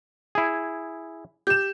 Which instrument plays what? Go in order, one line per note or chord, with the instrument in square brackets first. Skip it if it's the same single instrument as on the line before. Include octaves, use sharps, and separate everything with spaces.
[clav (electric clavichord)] E4 G#4
[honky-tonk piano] G4 E7 [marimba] G6